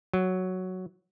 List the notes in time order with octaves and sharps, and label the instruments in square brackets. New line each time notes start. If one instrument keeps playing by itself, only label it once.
[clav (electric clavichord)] F#3